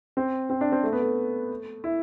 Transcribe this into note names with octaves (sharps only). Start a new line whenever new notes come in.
C4
C4
D4
C4
A3
B3
A3
E4